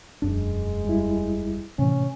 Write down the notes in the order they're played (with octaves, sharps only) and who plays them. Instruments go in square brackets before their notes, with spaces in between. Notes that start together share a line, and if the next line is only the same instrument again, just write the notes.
[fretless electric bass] E1 F#2 D4 [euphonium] G#3
[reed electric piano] G3 E4
[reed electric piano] A2 E3 [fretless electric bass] C3 [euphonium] C#4